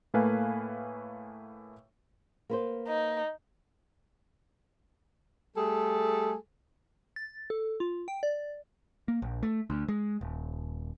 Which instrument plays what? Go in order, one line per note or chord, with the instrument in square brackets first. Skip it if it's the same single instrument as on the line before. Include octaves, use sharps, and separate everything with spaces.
[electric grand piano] A2 A3 A#3 B4 F5 G#5
[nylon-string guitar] A#3 B4 C5
[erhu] D#4
[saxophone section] G3 A3 G#4 A4
[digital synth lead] A6
A4
F4
G5
D5
[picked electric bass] A#3
A#1
A3
D2
G#3
D#1